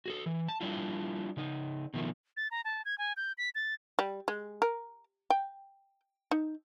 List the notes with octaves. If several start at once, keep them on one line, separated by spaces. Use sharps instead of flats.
F#4 G#4 A4
E3
A5
G3 D4 E4 F4
C#3 D#4
B2 D#3 F3 A3
A6
A#5
A5
G#6
G#5
G6
B6
A6
G3
G#3
A#4
G5
D#4